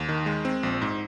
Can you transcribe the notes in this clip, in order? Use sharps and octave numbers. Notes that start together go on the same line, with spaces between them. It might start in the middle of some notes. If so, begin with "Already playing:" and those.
Already playing: D#2
D#3
G#3
C4
A#1
G#2